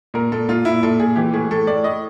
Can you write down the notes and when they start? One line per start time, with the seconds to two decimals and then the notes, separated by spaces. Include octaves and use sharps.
0.14 A#2 A#4
0.32 A#2 A4
0.49 A#2 F4
0.65 A#2 E4
0.83 A#2 A4
1.00 A#2 G#4
1.16 E3 G4
1.33 A2 G#4
1.51 A2 A4
1.67 A2 D5
1.84 A2 D#5